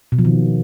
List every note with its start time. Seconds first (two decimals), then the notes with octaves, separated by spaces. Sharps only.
0.12 B2
0.18 F3
0.25 D#3